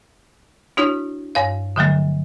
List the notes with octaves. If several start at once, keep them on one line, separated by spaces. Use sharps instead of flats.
D4 E4 F#4 C#5
G2 C#5 F5
D3 F3 F#3 A3